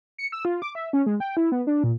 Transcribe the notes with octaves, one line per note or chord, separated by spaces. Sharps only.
C#7
E6
F4
D6
E5
C#4
G#3
G5
E4
B3
D4
A#2